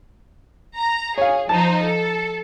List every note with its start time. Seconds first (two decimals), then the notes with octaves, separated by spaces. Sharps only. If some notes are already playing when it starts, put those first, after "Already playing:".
0.77 A#5
1.18 G#4 C#5 F5
1.49 F3 D#4 C5 A5
1.82 A4